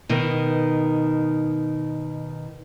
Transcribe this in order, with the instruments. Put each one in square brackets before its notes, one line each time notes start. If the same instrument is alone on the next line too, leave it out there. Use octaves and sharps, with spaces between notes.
[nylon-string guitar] B2 D#3